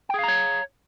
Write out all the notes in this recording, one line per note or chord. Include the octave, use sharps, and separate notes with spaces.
G#4 C#5 F5 G5 A#5